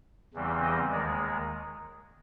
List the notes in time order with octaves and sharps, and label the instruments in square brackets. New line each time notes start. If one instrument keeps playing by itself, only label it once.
[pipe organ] E2 C#3 E3 G3 C4
D#5
D#2 D#3 G#3 D5